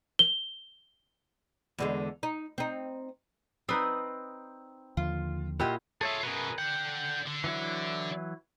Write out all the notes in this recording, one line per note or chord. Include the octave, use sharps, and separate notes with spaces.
G7
E2 D3 G#3
D#4
C4 D#4
C4 D#4 B4 D5 D#6
D#2 D3 F3 F4
A#2 E4 F4 G4 D#5 F#5
F4 G#4 A4 C#5 E5
F#2 B2 G#4 A#4 B4
D3 F#5 G5
D3
E3 F#3 E4